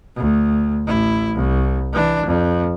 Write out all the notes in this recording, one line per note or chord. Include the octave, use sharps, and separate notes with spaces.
D2
A1 E4
C2
E3 D4
F2